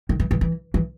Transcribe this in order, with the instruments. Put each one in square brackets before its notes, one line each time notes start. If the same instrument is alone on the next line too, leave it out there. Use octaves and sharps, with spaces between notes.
[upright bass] D#3
E3
E3
E3
E3